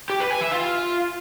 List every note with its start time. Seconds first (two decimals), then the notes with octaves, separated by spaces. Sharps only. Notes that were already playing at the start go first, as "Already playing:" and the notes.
0.10 G4
0.20 B4
0.31 G#5
0.41 E5
0.51 F4